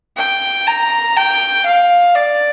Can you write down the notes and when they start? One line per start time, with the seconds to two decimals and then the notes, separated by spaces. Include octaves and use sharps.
0.17 G5
0.67 A#5
1.16 G5
1.66 F5
2.15 D5